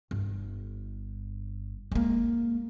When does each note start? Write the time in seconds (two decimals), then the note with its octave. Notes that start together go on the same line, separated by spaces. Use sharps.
0.11 G1
1.92 G#3 A#3